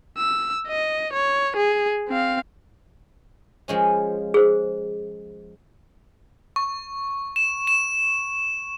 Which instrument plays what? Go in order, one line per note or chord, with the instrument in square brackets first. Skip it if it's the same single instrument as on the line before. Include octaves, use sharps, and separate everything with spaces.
[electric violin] E6
D#5
C#5
G#4
C4 F5
[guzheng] F3 G#3 C#4
[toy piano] G#4 C5
[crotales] C#6
E7
E7